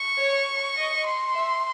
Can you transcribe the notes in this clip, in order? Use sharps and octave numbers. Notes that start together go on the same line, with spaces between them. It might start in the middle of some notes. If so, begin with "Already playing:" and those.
Already playing: C#6
C#5
D#5
C6
E5